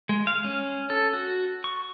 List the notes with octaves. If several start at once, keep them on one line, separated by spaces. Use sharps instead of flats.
G#3
F5
C#4
A4
F#4
C#6